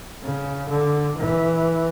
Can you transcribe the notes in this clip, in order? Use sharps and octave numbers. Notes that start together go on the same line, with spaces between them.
C#3
D3
E3